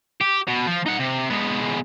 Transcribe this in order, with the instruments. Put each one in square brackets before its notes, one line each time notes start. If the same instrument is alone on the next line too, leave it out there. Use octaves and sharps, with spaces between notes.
[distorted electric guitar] G4
B2
F3
D#4 F#5
C3
G#3 B3